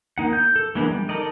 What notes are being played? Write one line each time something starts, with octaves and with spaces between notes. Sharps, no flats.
A#3 D#4 F#5
G6
A4
E3 G#3 A#3 B3 D4
G3
D#4 A4 A#4 D5 D#5